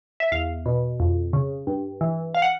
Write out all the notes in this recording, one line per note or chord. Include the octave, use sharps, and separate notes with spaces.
E5
E2 F5
B2
F2
C#3
G2
E3
F5
F#5